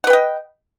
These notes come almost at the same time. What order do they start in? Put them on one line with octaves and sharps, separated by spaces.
F#5 B4 G5 D#5